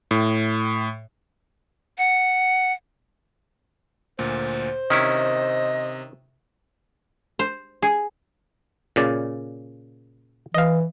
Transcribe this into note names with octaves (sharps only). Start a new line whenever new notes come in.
A2
F#5
D2 A#2 C5
C3 D#3 C#4 E4 D#5
C5
G#4
A#2 C#3 D5
E3 D#5 F5